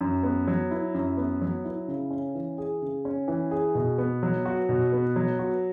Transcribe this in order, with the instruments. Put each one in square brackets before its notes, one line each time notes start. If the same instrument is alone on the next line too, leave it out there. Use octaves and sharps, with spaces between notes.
[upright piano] F#2
B3
F#3
E4
F#2
B3
F#3
E4
C#3
C#4
E3
G#4
C#3
C#4
E3
G#4
B2
B3
F#3
F#4
B2
B3
F#3
F#4